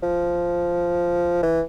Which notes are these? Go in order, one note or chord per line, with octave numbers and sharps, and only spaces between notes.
F3
E3